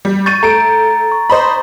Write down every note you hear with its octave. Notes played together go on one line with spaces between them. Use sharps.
G3
C#6 G6 A6 D#7
A3 A#5 D7
C#6
C5 D#5 B5